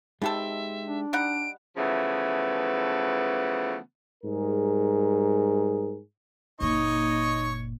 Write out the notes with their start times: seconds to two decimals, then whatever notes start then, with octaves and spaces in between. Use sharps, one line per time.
0.22 B2 G#3 C4 D#4 G4 A4 E5
0.86 D4
1.13 G3 D#4 F#5 D7
1.77 C#3 E3 F3 A3 B3
4.24 G#2 G3 G#4 A#4
6.61 F#1 A#2 D#4 C#5 D#5 C#6